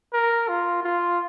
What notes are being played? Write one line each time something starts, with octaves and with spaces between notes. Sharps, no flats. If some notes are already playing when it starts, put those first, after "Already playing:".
A#4
F4
F4